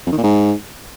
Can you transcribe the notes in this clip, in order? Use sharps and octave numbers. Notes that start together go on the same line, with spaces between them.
F2
D#3
A#2
G#2